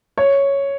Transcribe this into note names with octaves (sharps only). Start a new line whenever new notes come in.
C#5